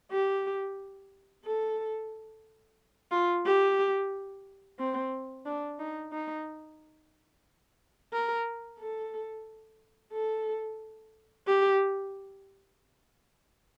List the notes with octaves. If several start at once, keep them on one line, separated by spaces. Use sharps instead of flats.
G4
A4
F4
G4
C4
D4
D#4
D#4
A#4
A4
A4
G4